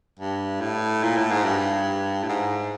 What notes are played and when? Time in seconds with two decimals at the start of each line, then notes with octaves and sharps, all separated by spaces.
0.19 G2
0.61 A2
1.03 A#2
1.17 A2
1.31 G#2
1.45 G2
2.23 A2
2.29 G#2